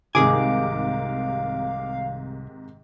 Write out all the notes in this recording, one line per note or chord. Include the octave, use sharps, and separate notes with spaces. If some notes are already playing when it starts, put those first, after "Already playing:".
C2 G#2 C3 D#3 G#4 F5 G#5 D6